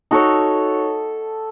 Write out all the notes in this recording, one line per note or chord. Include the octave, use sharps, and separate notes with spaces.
D#4 F#4 A4 C#5